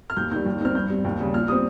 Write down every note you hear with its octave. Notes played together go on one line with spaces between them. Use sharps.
F6
D#2 G6
D#3 G3 G6
D#2
D#3 G3 C4 F6
G2 G6
G3 C4
D#2
C#3 G3
A#2 F6
G3 C4 D#6